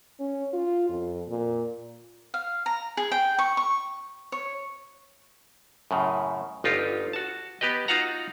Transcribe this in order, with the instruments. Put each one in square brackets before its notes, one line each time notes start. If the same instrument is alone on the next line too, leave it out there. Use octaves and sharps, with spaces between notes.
[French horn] C#4
F4
F2
A#2
[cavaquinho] F5
A#5
G#4
G5
C#6
C#6
C#5
[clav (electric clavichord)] F#2 A2 C#3
G1 D#4 F4 G4
F#4 A5
B3 G4 B4 D#5
D#4 F4 F#4 F5 F#5 A#5